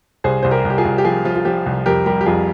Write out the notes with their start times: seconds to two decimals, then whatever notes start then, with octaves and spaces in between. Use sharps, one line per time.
0.24 C2 G#4 C5
0.43 C2 C5
0.51 G4 A#4
0.65 C2
0.70 G4
0.78 F4 G#4
0.85 C2
0.98 G4
1.05 F3 F4 G#4
1.25 F3 F4
1.35 F4
1.45 F3 G4
1.66 C2
1.86 F2 G4 A#4
2.06 G3 G4 A#4
2.21 G4
2.26 F2 F4 G#4